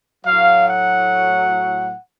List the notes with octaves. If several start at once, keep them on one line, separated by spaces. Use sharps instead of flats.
A2 F#3 F5
F#5